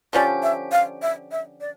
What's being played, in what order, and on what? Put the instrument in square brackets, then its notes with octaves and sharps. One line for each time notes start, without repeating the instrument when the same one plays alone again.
[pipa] D3 F3 C#4 G4 [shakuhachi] D5
[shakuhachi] E5
F5
E5
E5
D5